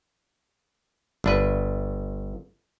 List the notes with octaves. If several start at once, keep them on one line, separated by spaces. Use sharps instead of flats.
G1 D4 B4